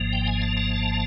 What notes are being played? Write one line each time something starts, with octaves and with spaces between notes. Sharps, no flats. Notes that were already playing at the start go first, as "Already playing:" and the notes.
Already playing: G#1 G#2 F3 A#3
G5
G#5
A5
A5